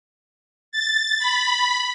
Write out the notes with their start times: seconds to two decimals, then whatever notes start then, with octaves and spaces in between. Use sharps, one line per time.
0.72 A6
1.19 B5